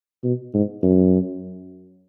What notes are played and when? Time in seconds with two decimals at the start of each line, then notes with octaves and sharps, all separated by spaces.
0.24 B2
0.54 G#2
0.83 F#2